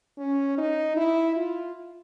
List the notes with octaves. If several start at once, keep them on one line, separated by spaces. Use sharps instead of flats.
C#4
D#4
E4
F4